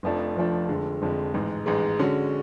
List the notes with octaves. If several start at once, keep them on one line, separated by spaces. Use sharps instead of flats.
F1 F2 F3 A3 D4
F1 F2 F3 A3 D4
F1 F2 D3 G#3
F1 F2 D3 G#3
A1 G#2 G#3
A1 G#2 G#3
D3 G#3 C#4 F#4